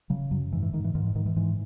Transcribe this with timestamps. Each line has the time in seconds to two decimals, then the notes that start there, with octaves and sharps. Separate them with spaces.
0.10 C#3 F#3
0.31 F#2 F#3
0.52 G#2 E3
0.62 E3
0.73 G#2 D#3
0.84 E3
0.95 G#2 D#3
1.04 E3
1.15 G#2 D#3
1.26 E3
1.36 G#2 E3